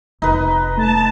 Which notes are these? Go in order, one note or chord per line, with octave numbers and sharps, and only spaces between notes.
F1 D#4 B4
A3 A5